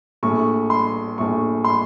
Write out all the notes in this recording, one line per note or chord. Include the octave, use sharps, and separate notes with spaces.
A#1 A2 A3 C#6
C6
A#1 A2 A3 C#6
C6